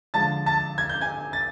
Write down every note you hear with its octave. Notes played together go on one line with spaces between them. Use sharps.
D3 F3 G#3 A5 A6
A5 A6
G#6
G6
G#5 G#6
A6